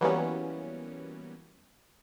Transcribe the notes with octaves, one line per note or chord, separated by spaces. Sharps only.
E3 F#3 G3 A#3 B3 C#4